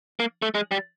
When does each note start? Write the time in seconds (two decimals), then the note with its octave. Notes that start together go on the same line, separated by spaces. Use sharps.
0.20 A#3
0.42 A3
0.55 G#3
0.71 G3